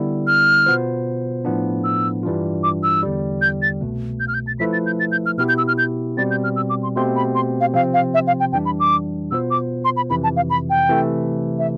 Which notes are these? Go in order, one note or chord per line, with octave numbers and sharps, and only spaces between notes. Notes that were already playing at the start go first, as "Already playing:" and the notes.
Already playing: D3 G3 B3 E4
F6
B2 B3 F4 C5
A2 F3 B3 D4
E6
G2 E3 G3 D4 F4
D6
E6
E2 D3 G3
G6
A6
C2 B2 A3
G6
F6
G6
A6
F3 A3 E4 B4 B6
A6
G6
A6
G6
F6
B2 B3 E4 G4 F6
G6
E6
F6
G6
B2 G3 C4 A6
G6
F6
E6
D6
C6
B2 A3 C4 G4 C5 C6
B5
C6
F5
C3 F3 C4 F5
F5
E5
F5
G5
F2 E3 G3 D4 G5
B5
D6
B2 B3 F4 C5 E6
D6
C6
B5
F2 C3 E3 B5
A5
F5
B5
G5
C3 E3 A3
E5